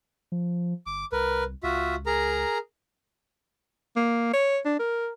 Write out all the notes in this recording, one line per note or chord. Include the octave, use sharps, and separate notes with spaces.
F3
G1 D6
C2 A#4 B4
C#2 F4 F#4 E5
G#4 A#4 A#5
A#3
C#5
D4
A#4